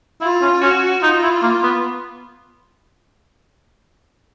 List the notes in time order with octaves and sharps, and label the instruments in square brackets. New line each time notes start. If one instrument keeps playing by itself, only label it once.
[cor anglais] E4 [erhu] F4
[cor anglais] C#4
[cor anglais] C#4 [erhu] F#4
[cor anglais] D#4 [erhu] F4
[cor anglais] E4
A#3
B3